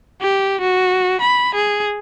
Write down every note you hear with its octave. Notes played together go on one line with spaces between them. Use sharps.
G4
F#4
B5
G#4